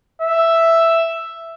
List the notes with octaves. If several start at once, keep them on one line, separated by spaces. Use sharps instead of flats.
E5